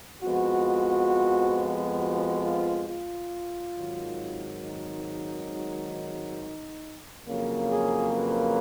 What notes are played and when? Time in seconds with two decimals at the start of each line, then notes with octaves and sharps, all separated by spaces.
0.22 F2 F3 G#3 B3 F#4
1.98 F#4
2.43 F4
2.87 F4
3.75 G#1 G#2 D#3 F#3
4.62 D#4
7.27 F2 C#3 F#3 A#3
7.71 G#4
8.15 B4